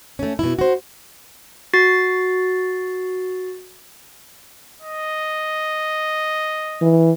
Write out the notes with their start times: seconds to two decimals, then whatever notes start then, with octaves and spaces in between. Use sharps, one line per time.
0.19 A3 C#4
0.39 B2 E4
0.59 F#4 C5
1.74 F#4 A6 C7
4.82 D#5
6.82 E3